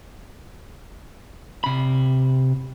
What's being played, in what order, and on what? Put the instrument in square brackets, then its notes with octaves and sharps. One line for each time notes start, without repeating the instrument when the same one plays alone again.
[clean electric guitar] C3 B5